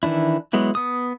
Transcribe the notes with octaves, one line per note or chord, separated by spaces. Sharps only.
D#3 E3 D4 E4
F#3 G#3 B3 E4
B3 D#6